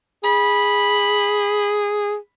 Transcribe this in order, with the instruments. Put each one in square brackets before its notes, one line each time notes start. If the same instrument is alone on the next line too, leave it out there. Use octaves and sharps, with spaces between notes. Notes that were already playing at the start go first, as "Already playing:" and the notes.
[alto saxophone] G#4 [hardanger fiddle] B5